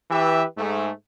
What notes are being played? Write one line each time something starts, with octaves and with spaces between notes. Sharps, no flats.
E3 G4 B4 E5
G#2 A3